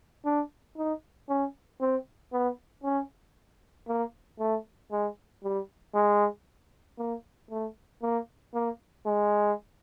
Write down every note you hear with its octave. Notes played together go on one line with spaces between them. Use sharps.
D4
D#4
C#4
C4
B3
C#4
A#3
A3
G#3
G3
G#3
A#3
A3
A#3
A#3
G#3